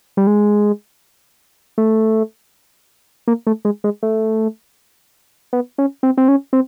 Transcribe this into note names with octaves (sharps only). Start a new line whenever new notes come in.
G3
G#3
A3
A#3
A3
G#3
G#3
A3
B3
C#4
C4
C4
C#4
C4